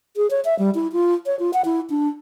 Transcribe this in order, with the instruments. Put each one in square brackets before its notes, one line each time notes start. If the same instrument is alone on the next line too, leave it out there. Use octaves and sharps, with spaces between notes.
[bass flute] G#4
C#5
E5
G3
E4
F4
C#5
F4
F#5
E4
D4